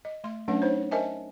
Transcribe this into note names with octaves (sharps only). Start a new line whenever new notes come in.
D#5
A3 C6
F#3 A3 C#4 D4 B4 F#5
D#4 C5 C#5
A#4 C5 D#5 E5 G#5 A5